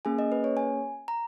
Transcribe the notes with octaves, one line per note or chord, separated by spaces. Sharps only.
A#3 C#4 G#4 G#5
D#5
B4
C#5
G#5
A#5